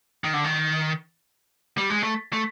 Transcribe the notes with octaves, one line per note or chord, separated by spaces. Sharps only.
D#3
D3
D#3
G3
G#3
A3
A3